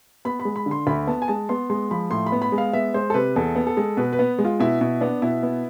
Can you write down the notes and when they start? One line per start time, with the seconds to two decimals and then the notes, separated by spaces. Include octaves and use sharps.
0.25 B3 B5
0.40 B5
0.45 G#3
0.56 B5
0.66 D3
0.71 C6
0.87 D2 B5
1.07 B3 A5
1.22 G#5
1.28 G#3 A5
1.49 B3 C6
1.70 G#3 C6
1.91 F3 B5
2.11 A2 C6
2.26 B5
2.32 B3
2.42 B5
2.52 G#3
2.58 F5
2.73 B3 E5
2.94 G#3 C5
3.10 A4
3.14 C3 B4
3.36 E2 A4
3.56 B3
3.67 A4
3.77 G#3
3.97 B2 B4
4.13 B4
4.19 B3
4.39 G#3
4.45 F4
4.60 B2 E4
4.81 B2 E4
5.01 B3 D4
5.22 B2 E4
5.43 B3